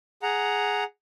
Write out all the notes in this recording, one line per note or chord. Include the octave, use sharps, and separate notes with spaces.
G#4 F#5 A#5